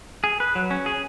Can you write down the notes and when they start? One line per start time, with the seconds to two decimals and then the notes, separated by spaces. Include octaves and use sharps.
0.24 G#4
0.40 B4
0.55 F#3
0.71 C#4
0.86 G#4